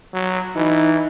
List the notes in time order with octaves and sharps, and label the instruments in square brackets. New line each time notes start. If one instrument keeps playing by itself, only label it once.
[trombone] F#3
[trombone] E3 [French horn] D#4